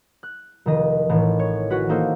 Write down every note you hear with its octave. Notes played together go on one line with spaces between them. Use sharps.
F#6
F1 D#3 D#5
A1 A2 D#3 E3
C#5
C#4 F#4 B4
A#3 D#4 A4 C5